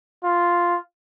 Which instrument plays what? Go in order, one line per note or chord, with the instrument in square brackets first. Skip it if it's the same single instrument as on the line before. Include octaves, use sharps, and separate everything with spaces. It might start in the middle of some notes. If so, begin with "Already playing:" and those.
[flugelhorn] F4